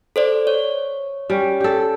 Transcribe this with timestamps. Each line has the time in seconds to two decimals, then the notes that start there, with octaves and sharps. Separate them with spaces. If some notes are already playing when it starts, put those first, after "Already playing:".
0.16 A4 C5 D5
0.47 C#5
1.30 G3 C#4
1.60 G4 A4